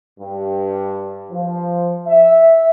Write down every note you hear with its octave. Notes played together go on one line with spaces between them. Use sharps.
G2
F3
E5